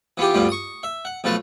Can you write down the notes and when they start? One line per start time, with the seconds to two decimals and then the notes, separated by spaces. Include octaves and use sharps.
0.17 E3 B3 F4 G4
0.34 D2 G2 G3 B3 F4
0.49 C#6 D#6
0.83 E5
1.05 F#5
1.24 B1 F3 A3 B4 A5